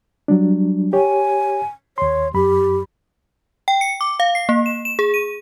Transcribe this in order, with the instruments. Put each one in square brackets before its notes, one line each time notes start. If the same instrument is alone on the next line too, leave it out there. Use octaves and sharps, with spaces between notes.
[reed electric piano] F#3 G3 D4
[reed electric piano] G4 C#5 [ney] G#5
[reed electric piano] D#2 C6 [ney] C#5
[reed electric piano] F#2 B5 [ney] G4
[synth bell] G5
C#7
D6
F5
C7
A#3
E7
E7
G#4
D#7